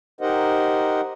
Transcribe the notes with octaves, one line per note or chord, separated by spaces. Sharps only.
D#4 G4 A#4 C5 D#5 F#5